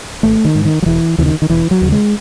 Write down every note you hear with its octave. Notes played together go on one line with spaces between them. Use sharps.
G#1 A3
D#3
G#2
D#3
F#3
E1 E3
D#2 C#3 E3
D#3
D#3
E1 E3
F#3
D#2 C#3
G#3